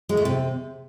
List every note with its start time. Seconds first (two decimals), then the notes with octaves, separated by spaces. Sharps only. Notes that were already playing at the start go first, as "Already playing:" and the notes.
0.09 G#3
0.17 A3
0.25 C3